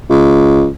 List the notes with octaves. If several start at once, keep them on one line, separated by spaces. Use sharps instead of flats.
C#2